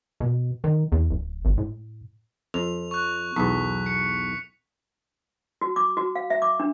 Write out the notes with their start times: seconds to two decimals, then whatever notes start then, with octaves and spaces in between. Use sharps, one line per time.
0.20 B2
0.64 D#3
0.92 E2
1.11 D1
1.45 G#1
1.58 A2
2.54 F2 F7
2.91 C#6 F#6
3.36 B1 E2 B6
3.86 C#7
5.61 F#4
5.76 D6
5.97 F#4
6.16 F5
6.30 E5
6.42 D6
6.60 D4